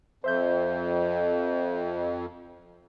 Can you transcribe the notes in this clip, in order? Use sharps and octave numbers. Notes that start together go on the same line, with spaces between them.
F2 C5 E5 G6